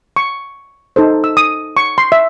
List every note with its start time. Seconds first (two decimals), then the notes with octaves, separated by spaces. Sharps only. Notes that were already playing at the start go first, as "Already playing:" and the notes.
0.16 C#6
0.96 D#4 A4 C5
1.24 E6
1.37 D#6
1.77 C#6
1.98 C6
2.12 E5